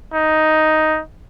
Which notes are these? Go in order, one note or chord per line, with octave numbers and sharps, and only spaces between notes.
D#4